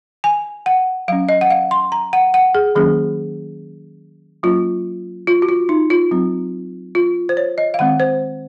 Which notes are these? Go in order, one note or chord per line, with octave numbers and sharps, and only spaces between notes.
G#5
F#5
F#3 C#4 F5
D#5
F#5
F5
C6
A#5
F#5
F#5
G#4
D#3 F#3 A#3 C#4 G#4
F#3 A#3 C#4 F4
F4
F#4
F4
D#4
F4
F#3 C4
F4
C5
C#5
D#5
F5
D#3 G#3 C4 F#5
C5